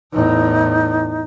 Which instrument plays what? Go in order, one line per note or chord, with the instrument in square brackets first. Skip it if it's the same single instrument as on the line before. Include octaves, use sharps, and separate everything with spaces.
[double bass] E2 A2 [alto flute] D#4